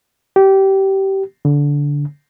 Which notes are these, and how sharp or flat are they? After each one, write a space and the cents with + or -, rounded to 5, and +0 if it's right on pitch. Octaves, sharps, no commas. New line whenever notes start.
G4 -20
D3 -20